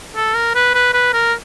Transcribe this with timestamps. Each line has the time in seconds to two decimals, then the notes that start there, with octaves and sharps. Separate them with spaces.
0.16 A4
0.35 A#4
0.55 B4
0.74 B4
0.94 B4
1.13 A#4